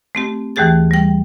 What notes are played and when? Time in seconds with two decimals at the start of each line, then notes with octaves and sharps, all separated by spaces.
0.15 A3 C4 G4
0.56 D#2 E3 A3 G4 G#4 A6
0.91 G3 G5